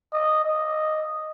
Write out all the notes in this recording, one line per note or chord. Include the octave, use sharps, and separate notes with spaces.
D#5
D#5